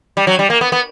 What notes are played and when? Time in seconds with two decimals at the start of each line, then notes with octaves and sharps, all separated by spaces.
0.17 G3
0.27 F#3
0.39 G3
0.50 A#3
0.61 B3
0.72 B3